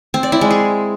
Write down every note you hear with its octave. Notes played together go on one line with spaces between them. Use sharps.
C4
D5
E4
G#3
G#4